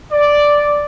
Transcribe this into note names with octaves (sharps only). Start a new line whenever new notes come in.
D5